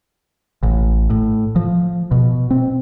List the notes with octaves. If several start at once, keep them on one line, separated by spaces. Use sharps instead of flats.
A1
A2
F3
B2
C4